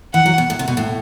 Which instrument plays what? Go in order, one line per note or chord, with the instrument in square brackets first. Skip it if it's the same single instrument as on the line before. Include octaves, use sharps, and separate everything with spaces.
[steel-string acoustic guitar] E3 [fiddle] F#5
[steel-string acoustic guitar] F#3
B2
A2
C3
B2
A2